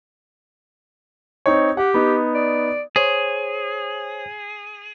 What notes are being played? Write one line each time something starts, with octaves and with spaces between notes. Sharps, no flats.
C4 D#4 C#5
G4 F#5
B3 D#4
D5
G#4 C5 C#5